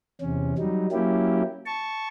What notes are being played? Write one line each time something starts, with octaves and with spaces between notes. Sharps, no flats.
E2 C3 C#4
F#3 G3 D#4
F#3 A#3 C#4 E4 G4
A5 C#6